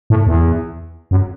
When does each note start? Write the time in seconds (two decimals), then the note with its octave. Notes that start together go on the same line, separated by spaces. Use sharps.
0.10 A2
0.27 E2
1.11 F#2